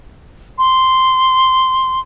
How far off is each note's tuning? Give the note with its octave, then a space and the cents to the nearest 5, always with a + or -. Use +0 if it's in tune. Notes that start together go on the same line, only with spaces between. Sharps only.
C6 -5